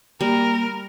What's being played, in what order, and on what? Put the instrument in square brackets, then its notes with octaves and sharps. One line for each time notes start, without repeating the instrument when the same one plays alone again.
[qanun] G3 [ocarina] A#3 [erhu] A#4